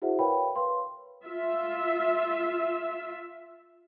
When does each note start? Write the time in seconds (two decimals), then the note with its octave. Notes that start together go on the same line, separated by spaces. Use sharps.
0.02 E4 F#4 G#4 C5 E5 F#5
0.19 A#4 B4 C#5 F5 G5 B5
0.56 B4 C#5 F5 C6
1.25 F4 E5